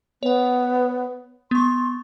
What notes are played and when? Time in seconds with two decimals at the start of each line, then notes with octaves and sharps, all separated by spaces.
0.23 B3 C#5 F#5
1.51 B3 C6 C#6